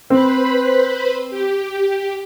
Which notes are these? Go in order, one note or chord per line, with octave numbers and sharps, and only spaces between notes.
C4 B4 C5 B5
G4